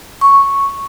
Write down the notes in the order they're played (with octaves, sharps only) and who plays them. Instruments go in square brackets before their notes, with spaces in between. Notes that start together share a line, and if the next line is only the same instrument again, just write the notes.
[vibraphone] C#6